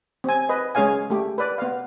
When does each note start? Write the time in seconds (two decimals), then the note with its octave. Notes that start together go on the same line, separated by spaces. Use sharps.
0.24 C4 G#5
0.49 B4 D#5
0.75 G#3 C#4 G#4 C#5 F5 G#5
1.10 A3 G4
1.38 B4 D5
1.58 B3 F5